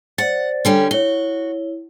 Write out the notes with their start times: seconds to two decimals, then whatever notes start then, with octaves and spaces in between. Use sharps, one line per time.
0.18 C5 D5 F#5 A6
0.65 D3 G3 C#4 A4 G5
0.91 E4 F#4 C#5 G7